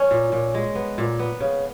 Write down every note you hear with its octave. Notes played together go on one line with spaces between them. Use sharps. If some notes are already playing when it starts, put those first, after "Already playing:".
Already playing: C#4
A#2
A#2
G#3
B3
A#2
B3
C#3